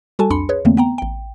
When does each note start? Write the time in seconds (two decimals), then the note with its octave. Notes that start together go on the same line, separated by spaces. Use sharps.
0.19 G3 F#4 A4 G#5 A5
0.30 C2 F2 D4 B5 C6 C#7
0.49 G#4 B4 C#5
0.65 F2 D3 E3 A3 A#3 C4
0.77 B3 G5 A#5
0.98 A1 G5